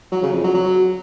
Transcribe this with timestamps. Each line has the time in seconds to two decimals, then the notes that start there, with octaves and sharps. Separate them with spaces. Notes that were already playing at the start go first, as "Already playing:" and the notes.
0.12 F#3
0.22 C#3
0.33 F2
0.44 F#3
0.54 F#3